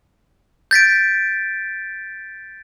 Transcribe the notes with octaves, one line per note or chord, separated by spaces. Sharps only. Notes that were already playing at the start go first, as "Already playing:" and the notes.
G6 A6 B6 D7